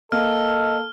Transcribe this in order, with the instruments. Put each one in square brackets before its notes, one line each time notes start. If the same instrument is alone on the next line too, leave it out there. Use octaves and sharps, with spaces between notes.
[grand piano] A#3 [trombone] A4 [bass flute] D#5 [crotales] F6